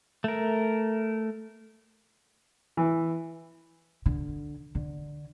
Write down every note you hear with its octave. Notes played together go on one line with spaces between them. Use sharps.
A3 A#4
E3
D3
D3